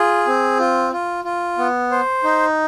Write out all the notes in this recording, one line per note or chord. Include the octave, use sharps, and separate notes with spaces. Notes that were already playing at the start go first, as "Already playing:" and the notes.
Already playing: F4 G#4
C4
F4
F4
F4
B3
C5
D#4